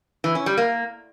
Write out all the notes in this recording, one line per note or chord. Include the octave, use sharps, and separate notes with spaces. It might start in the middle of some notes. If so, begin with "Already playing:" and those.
E3
C#4
G3
A#3